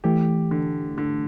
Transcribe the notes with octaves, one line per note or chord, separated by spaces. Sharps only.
E3 A3 G4
D3
D3